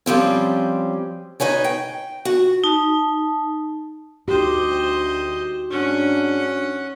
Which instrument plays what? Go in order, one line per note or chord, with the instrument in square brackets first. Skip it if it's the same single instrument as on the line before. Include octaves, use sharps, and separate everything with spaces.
[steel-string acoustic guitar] F3 G3 C4 C#4
D#4 B4 C#5 G#5
G5
F#4
[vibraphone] D#4 A5
[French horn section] D2 [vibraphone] D#4 F#4 [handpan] G4 [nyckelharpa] C5 D#5
[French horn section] G#2 D4 [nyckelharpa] C#4 F#5